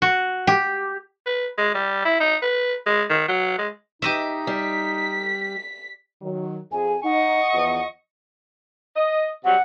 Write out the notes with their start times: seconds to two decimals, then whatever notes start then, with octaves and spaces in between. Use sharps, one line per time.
0.02 F#4
0.47 G4
1.26 B4
1.58 G#3
1.75 G3
2.05 E4
2.21 D#4
2.42 B4
2.86 G#3
3.10 D#3
3.29 F#3
3.58 G#3
4.02 D#4 G4 D#5 E5
4.47 G3 B6
6.22 D#3 F#3
6.72 F2 G#4 G#5
7.04 D#4 D#5 F#5 C#6
7.53 E2 F3 B3
8.96 D#5
9.45 C3 F#3 G3 F#5